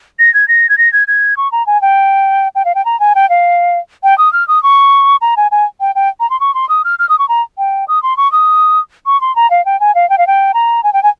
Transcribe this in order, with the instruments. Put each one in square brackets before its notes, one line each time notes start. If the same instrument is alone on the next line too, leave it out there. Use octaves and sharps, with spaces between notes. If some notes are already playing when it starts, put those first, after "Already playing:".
[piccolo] A#6
G#6
A#6
G#6
A#6
G#6
G#6
C#6
A#5
G#5
G5
G5
F5
G5
A#5
G#5
G5
F5
G5
D#6
F6
D#6
C#6
A#5
G#5
G#5
G5
G5
A#5
C6
C#6
C6
D#6
F6
F6
D#6
C#6
A#5
G5
D#6
C6
C#6
D#6
C#6
C6
A#5
F5
G5
G#5
F5
G5
F5
G5
A#5
G#5
G5
G#5